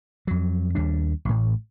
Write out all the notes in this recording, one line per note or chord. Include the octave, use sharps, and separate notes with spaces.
F2 F#3
D#2 G3 D4
A1 A2